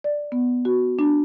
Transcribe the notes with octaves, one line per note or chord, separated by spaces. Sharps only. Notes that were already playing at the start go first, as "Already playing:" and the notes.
D5
B3
F#4
D4